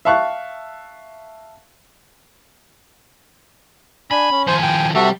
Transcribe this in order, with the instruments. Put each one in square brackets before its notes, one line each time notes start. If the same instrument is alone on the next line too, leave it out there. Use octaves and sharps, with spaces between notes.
[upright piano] E5 F5 A5 C#6 F#6
[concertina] D4 G#5 [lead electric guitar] B5
[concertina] C#4
[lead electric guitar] D#3 F3 [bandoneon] C5 [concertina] G#5
[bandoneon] G5
[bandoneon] C3 [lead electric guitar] G3 [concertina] F#4 A4 E5